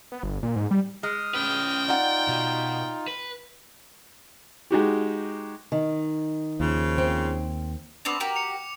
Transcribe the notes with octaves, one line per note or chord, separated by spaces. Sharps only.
B3
G1
A#2
G#2
G3
G#3 D#6 F6
C#4 B4 G5
D#4 F4 D5 F#5
B2
B4
G#3 D#4 F#4 G4
D#3
D#2 C#3 F3
C4
B3 C4 D4 D6 F7
F#4 G4 A#4
C#7 F7